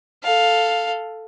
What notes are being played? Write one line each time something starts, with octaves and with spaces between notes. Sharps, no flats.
A4 F5